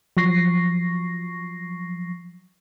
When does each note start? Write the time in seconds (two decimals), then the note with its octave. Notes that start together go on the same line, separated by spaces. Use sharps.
0.17 F3 F#3 C#6 A#6 C7